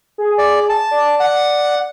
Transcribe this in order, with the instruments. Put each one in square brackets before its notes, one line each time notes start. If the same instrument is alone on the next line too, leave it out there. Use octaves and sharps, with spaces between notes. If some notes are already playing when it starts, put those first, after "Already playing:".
[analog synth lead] G#4
[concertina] D5
A5
[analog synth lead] D5
[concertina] F#5